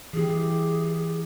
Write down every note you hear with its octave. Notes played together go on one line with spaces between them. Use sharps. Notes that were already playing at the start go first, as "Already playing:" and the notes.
E3 G4 G#4